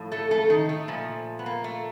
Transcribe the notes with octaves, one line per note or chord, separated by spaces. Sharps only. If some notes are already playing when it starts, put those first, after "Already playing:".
Already playing: A2 F3
A3 A4
A3 A4
D#3 D#4
A3
A#2 F3
B3
A#3
A3